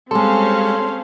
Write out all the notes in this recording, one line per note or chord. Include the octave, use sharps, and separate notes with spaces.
G3 G#3 C4 C#4 A4 F5 C6